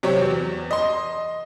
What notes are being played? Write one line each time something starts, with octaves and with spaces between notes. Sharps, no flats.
C3 F#3 C4 G4 C#5
E2
D#5 C6